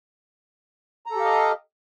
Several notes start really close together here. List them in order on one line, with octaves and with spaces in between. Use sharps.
A#5 A4 G4 F5 D#5